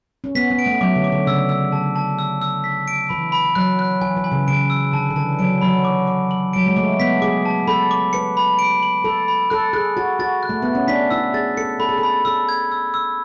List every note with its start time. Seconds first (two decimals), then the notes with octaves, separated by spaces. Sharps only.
0.24 C#4
0.35 B3 B6
0.51 B3
0.59 D7
0.66 A3
0.81 F#3 D6
0.96 D3
1.04 D6
1.12 D3
1.27 C#3 E6
1.49 E6
1.72 D3 A5
1.96 A5
2.19 E6
2.42 E6
2.64 B6
2.88 D7
3.09 E3 B5
3.32 B5
3.55 F#3 F#6
3.79 F#6
4.01 E3 G#5
4.17 E3
4.24 G#5
4.32 C#3
4.47 C#3 D7
4.70 E6
4.92 D3 A5
5.10 D3
5.16 E3 A5
5.39 F#3 D7
5.61 F#3 B5
5.85 D6
6.07 D6
6.31 F#7
6.53 F#3 D7
6.66 G#3
6.76 A3 D6
7.00 B3 B6
7.22 G#4 D6
7.45 A5
7.67 A4 B5
7.91 D6
8.13 B4 C#7
8.37 B5
8.59 D7
8.83 F#7
9.04 A4 B5
9.28 B5
9.50 A4 F#6
9.73 G#4 F#6
9.97 F#4 A6
10.19 F#4 A6
10.43 F#6
10.49 A3
10.62 B3 F#6
10.75 C#4
10.88 D4 B6
11.10 E4 E6
11.34 G#4 A6
11.57 A4 C#7
11.79 A4 B5
11.89 G#4
11.98 A4
12.03 B5
12.25 A4 E6
12.49 G#6
12.72 E6
12.94 E6